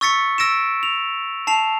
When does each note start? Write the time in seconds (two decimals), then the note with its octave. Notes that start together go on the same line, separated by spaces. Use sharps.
0.01 C#6 E6 A6 B6 C#7
0.38 E6 A#6 D7 E7
0.83 F7
1.47 A5 C7 F7